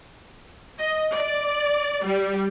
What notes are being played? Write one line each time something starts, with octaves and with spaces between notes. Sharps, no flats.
D#5
D5
G3